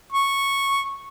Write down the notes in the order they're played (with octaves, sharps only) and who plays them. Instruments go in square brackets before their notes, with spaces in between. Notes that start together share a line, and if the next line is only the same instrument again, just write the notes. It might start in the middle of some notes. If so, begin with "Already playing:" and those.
[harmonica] C#6